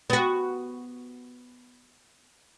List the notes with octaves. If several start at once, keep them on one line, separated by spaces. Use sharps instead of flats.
B3 F#4